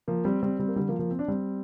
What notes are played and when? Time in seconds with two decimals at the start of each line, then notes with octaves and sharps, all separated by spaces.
0.08 F3 A#3
0.25 G3 C4
0.42 G3 C4
0.59 G3 C4
0.68 A#3
0.76 D3 G3
0.89 F3 A#3
0.99 F3 A#3
1.11 C4
1.19 D4
1.28 G3 C4